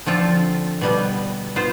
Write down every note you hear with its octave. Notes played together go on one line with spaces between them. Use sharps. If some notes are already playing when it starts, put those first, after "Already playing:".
D3 F3 C4 F4 A4
B2 G3 B3
B3 F4 C5